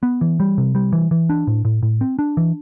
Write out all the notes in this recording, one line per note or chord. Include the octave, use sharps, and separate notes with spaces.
B3
E3
G3
C3
G3
E3
E3
D4
A2
A2
A2
C4
D4
E3